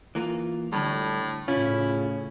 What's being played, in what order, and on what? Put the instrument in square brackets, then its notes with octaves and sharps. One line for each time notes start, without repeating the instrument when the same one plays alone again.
[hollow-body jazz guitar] E3 A#3 F4
[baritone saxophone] A2 [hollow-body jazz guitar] D3 G3
[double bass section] A2 C#3 [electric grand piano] C#4 [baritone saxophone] E4 [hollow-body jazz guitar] F4